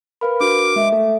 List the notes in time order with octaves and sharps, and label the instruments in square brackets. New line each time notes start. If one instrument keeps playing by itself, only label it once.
[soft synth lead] A#4 [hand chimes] B4 F5 B5
[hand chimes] D4 F#4 [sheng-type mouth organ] D6
[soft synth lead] G#3 [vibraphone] E5
[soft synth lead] A3 [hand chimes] A4